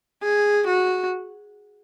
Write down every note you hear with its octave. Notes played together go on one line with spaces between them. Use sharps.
G#4
F#4